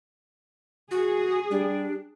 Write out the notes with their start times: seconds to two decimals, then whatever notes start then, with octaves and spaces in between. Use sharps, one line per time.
0.91 F#4 G#4
1.51 G3 D4